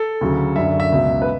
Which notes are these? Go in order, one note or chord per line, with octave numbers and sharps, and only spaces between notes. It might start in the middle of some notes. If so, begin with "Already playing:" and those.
Already playing: A4
D2 C#3 F#3
F#2 D3 F#3 E5
E5
C#2 B2 F#3
B4